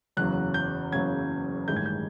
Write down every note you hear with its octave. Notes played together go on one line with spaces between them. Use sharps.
F#1 E2 C#3 F#3 F#6
G6
F#1 E2 C#3 F#3 G#6
A1 G2 D#3 G#3 G6
G#6
G6